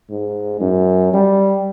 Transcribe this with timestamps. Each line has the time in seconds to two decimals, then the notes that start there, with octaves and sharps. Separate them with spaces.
0.10 G#2
0.61 F#2
1.14 G3